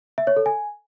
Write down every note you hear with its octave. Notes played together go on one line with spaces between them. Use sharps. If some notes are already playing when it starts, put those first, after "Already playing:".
E5
C#5
A4
G#5